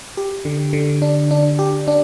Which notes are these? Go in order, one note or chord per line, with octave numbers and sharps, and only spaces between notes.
G4
D3
D3
D4
D4
G4
D4